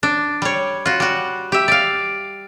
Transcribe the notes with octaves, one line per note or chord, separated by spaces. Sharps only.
D4
G3 C#5
F4 F#4
G3 F#4
G4 E5
D5 F5